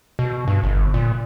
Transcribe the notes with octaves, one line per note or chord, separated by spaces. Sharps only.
B2
G2
G1
A#2